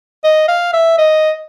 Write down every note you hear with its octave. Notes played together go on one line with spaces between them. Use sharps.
D#5
F5
E5
D#5